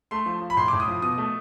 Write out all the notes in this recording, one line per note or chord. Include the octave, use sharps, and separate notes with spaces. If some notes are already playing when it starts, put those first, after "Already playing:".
A3 C6
F3
F3
B5
A2 C6
A2 D6
D#6
F3
B2 D#6
A3